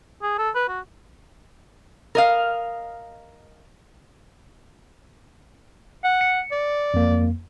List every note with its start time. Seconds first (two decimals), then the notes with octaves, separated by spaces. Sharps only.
0.22 G#4
0.38 A4
0.55 B4
0.68 F#4
2.15 A#4 D#5 F5
6.04 F#5
6.21 C#7
6.51 D5
6.94 F2 A#3